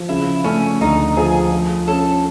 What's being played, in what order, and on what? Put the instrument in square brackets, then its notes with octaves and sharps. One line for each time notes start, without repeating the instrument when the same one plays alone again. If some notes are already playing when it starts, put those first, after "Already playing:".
Already playing: [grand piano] F3
[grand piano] C#3 [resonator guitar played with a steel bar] E4
[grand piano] A3 [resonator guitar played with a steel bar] C#4
[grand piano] D2 [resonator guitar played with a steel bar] D#4
[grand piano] F3 [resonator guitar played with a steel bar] G#4
[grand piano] F3
[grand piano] C#4 [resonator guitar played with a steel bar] A4